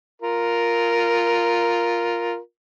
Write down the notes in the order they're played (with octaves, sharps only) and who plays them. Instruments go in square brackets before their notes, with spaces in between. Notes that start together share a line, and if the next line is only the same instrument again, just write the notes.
[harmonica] F4 A#4